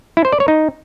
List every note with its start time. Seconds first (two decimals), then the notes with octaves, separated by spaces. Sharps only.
0.17 E4
0.25 C5
0.32 D5
0.40 C#5
0.48 D#4